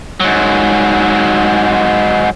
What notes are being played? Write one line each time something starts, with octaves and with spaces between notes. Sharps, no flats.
G#2 F#3